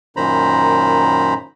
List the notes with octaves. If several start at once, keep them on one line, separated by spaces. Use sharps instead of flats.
F#2 A#2 D#3 C5 A#5 B5